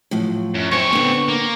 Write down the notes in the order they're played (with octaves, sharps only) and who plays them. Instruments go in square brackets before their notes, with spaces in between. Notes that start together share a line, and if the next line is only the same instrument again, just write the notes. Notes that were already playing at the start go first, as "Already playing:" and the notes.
[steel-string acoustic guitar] A2 F3 F#3
[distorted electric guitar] F#2
[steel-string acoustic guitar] F#2 C5 [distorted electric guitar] C4 C#5 [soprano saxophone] C#6
[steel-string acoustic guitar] D3 B3
[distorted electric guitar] A#3